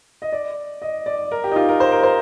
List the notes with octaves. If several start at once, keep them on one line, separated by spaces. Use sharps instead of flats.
D#5
D5
D#5
D5
A#4
G4
D#4
F4
A#4
C5
A#4
C5